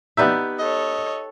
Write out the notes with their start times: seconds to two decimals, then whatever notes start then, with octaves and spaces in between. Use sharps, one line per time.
0.17 B3 D#4 G4 B4 D5 E5
0.59 A4 C#5 D#5